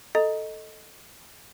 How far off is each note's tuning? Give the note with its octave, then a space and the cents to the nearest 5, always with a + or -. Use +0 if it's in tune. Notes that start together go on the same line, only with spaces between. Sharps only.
A4 +0 D#5 +0 A#5 +0